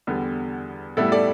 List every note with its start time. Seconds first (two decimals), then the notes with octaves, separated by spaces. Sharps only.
0.07 E2 D3 G3 B3
0.97 A2 G3 B3 E4 A4
1.12 A4 D5